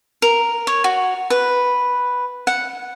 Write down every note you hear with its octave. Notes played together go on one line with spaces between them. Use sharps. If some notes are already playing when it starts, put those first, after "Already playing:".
A#4
C#5
F#4
B4
F#5